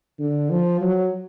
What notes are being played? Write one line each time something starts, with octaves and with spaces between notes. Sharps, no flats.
D3
F3
F#3